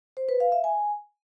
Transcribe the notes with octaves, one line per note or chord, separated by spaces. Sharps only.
C5
B4
F5
E5
G#5